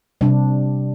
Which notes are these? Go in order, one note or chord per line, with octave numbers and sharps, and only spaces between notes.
C3 G3 D4